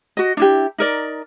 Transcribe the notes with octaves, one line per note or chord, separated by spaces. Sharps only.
F#4 D#5
D4 E4 G4
D#4 A#4 D5